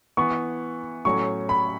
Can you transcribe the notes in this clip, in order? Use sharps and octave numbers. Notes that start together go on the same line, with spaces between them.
E3 B3 C#6
A2 F#3 C#4 C#6
B5